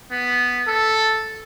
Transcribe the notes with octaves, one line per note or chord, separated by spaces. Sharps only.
B3
A4